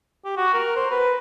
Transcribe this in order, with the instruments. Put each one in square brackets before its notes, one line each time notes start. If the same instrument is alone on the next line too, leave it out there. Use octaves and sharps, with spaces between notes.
[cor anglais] G4
F#4
A#4
C5
B4